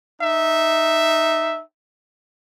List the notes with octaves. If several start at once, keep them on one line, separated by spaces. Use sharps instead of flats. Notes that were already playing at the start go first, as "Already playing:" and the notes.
D#4 E5